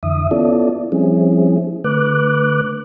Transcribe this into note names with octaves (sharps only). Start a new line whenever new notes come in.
F2 D3 E3 E5 D#6
B3 C#4 E4 F4 A4 D5
F3 G3 C4 C#4 E4 G#4
D3 A3 B4 D6 F#6